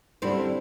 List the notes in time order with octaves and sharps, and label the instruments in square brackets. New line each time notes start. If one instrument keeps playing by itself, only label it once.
[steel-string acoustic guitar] D2 D3 G3 D4 [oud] C4 E4